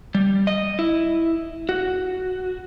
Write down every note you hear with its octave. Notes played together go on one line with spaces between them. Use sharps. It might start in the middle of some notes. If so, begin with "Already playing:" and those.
G3
D#5
E4
F#4